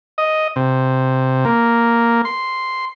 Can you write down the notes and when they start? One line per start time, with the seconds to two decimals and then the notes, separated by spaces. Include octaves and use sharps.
0.18 D#5
0.56 C3
1.45 A#3
2.25 C6